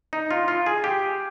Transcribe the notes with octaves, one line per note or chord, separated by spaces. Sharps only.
D#4
F4
F4
G#4
G4